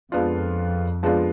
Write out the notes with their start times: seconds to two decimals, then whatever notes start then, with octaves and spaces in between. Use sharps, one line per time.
0.12 F2 F3 G#3 B3 D4 F4
1.03 F3 G#3 B3 D4 F4